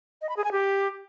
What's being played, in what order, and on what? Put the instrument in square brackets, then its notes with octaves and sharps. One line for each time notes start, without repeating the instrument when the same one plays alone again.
[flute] D#5
B5
G#4
G#5
G4